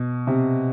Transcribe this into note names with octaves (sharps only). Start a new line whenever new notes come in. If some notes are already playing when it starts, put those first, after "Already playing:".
Already playing: B2
C3